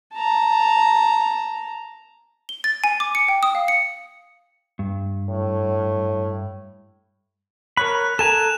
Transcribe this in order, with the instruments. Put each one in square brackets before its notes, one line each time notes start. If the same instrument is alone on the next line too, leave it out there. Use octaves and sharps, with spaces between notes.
[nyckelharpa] A5 A#5
[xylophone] G7
A6
G#5
D6
C#7
G5
D#6
F5
C#7
[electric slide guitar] G2
[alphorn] A2
[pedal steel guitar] A#4 C#5 B5 [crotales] F#6
[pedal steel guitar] A4 G#5 A#5 [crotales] E7